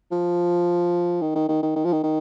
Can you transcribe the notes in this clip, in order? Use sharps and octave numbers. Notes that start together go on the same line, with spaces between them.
F3
D#3
D#3
D#3
D#3
D#3
F3
D#3
D#3